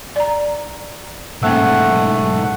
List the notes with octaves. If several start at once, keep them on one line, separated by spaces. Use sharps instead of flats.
D5 A#5
B1 G#2 A3 A#3 C#4 F#5